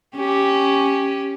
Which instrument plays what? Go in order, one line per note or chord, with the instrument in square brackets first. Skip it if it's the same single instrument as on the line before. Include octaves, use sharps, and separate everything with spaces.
[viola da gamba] C#4 G4